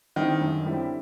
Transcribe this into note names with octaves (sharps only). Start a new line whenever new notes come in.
D3 D#3 G3 C4 E4
F#2
D3 G3 C4 E4